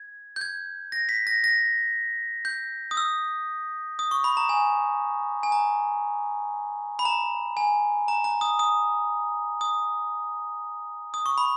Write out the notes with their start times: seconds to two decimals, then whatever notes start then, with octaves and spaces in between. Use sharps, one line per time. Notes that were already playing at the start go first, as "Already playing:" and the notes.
Already playing: G#6
0.36 G6
0.41 G#6
0.92 A#6
1.09 B6
1.27 A#6
1.44 A#6
2.45 G6
2.91 D#6
2.97 E6
3.99 D#6
4.11 C#6
4.24 B5
4.37 A#5
4.49 G#5
5.43 G#5
5.52 A#5
6.99 B5
7.05 A#5
7.57 G#5
8.08 A#5
8.24 A#5
8.41 D#6
8.59 D#6
9.61 D#6
11.14 D#6
11.26 C#6
11.38 B5